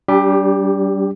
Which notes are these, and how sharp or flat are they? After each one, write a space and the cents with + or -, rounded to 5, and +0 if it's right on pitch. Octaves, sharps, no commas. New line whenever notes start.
G3 -25 D4 -30 G4 +15